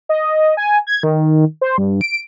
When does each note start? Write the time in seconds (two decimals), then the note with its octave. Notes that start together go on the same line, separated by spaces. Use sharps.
0.09 D#5
0.57 G#5
0.87 G#6
1.03 D#3
1.61 C5
1.78 G2
2.01 D7